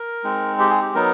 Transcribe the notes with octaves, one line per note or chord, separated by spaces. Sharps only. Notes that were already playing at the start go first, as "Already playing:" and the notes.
Already playing: A#4
G#3 C4 D#4
G4
G#4
G4
F#3 B3 D#4 A#4